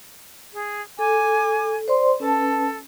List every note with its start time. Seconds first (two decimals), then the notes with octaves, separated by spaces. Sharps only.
0.53 G#4
0.99 A4 G#5 D6
1.88 C5 D5 C6
2.20 C#4 A4 B4 A5